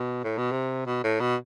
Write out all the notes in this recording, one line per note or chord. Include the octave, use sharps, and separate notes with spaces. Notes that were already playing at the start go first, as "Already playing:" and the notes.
Already playing: B2
A2
B2
C3
B2
A2
B2